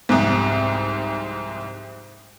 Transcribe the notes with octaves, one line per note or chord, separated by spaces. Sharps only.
C2 F2 G#2